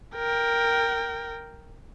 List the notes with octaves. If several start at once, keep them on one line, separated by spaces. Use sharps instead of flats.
A#4 G5